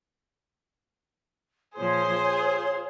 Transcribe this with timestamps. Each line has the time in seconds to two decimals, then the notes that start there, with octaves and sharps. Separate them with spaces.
1.77 A#2 F3 G#4 C5 C#5 C6
2.23 F4